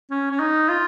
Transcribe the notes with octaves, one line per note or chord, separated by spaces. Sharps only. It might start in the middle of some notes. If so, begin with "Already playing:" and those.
C#4
C#4
D#4
F4